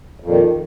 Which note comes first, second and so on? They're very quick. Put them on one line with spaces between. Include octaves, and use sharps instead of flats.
F2 A#2 D#3